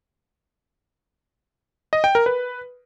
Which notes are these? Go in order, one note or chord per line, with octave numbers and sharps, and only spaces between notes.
D#5
G5
A#4
B4